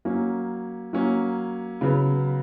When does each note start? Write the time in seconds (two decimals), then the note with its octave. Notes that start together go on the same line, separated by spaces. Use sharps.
0.05 F#3 A#3 C#4
0.93 F#3 A#3 C#4
1.81 C#3 F#3 B3